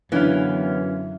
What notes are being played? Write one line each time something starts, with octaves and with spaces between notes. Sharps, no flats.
F#2 D3 E3 B3 C#4 F5